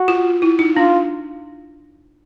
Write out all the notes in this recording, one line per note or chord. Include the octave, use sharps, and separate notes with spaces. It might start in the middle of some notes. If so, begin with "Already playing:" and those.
Already playing: F#4
F4
E4
D#4
D4 F4